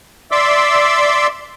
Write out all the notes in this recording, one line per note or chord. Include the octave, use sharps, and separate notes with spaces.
D5 E5 C6 D6 E6